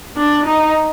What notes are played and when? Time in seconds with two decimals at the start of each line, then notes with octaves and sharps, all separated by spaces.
0.17 D4
0.46 D#4